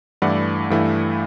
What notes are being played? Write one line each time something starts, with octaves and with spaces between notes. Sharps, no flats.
G2 E3 A3 E4 D5 F#5
G2 E3 A3 E4